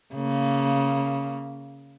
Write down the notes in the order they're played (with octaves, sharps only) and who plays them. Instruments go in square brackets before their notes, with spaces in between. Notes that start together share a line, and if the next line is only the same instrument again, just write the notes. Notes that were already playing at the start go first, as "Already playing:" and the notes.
[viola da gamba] C#3 A#3